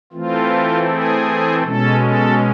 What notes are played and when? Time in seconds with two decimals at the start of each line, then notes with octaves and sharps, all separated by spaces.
0.13 E3 A3 C4 F4
0.88 G#4
1.63 B2 G#3 C#4 A4
2.01 A4